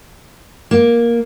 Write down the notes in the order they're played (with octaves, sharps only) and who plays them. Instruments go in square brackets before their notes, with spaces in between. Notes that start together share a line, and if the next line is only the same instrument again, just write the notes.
[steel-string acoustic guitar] A#3